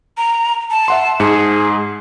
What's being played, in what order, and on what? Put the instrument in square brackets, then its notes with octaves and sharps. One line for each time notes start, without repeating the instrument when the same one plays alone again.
[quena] A#5
A5
[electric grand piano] E5 F#5 C6
[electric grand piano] G#2 C#7 [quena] G#4